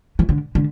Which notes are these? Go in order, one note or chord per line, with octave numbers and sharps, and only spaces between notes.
E3
D3
D3